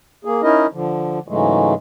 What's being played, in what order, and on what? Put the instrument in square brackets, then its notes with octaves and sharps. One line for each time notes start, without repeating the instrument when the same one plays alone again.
[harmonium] A#3 G#4
C#4 D#4 E4 A#4 D#5
D3 F3
G#2 C#3 E3 F#3 G#3 A3